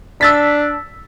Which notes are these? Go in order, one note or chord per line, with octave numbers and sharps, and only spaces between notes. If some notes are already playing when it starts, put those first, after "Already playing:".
D4 E6 A6 B6